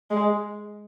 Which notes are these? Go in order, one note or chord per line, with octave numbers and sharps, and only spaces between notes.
G#3